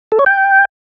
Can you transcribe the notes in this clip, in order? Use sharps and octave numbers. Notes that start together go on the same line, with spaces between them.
A4
C#5
G5